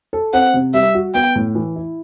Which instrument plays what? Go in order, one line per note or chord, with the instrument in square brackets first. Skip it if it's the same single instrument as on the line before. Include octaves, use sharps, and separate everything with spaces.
[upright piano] A4
[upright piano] C4 [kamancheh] F#5
[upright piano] C3
[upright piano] G3 [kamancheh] E5
[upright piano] F#4
[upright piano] B3 [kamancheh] G5
[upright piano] A2
E3
E4